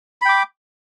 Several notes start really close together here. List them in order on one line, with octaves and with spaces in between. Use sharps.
B5 G5 D6